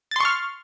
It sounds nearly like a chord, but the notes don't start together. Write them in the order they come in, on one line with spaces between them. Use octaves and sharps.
A6 C6 C#6 F6